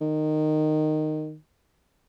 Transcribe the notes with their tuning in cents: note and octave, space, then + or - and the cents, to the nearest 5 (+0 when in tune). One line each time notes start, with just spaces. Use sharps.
D#3 -15